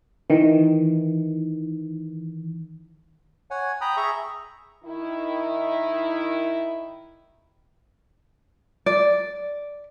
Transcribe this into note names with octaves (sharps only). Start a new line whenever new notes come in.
D#3 E3
C#5 F#5 G#5
G5 A#5 B5 D#6
G#4 E5 A#5 C#6
D#3 E4
D5